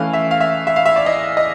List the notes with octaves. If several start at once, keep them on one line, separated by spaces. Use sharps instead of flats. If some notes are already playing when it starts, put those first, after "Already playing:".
Already playing: E3 A3 C#4 F5
E5
F5
E5
E5
F5
E5
D5
D#5
D#5